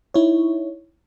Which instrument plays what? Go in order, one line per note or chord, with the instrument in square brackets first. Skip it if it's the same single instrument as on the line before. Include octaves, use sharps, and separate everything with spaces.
[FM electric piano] D#4 E4 C#5